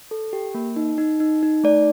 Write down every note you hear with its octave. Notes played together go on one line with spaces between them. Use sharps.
A4
G4
A#3
D#4
D#4
D#4
D#4
A3 D5